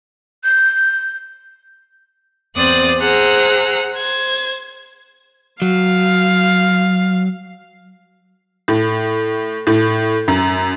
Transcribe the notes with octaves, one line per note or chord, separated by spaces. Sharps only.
G6
E2 C4 C5 D5 D#6 F#6
G#4 C5 F#5 A#5 E6
C5 G#6
F#3 F5
A2
A2
F#2